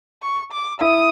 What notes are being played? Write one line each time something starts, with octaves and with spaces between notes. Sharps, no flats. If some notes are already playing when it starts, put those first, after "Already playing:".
C#6
D6
E4 D#6